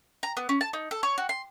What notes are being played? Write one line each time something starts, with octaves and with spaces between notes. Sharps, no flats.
A#5
B3
C#4
A5
D#4
A4
C#5
F#4
C6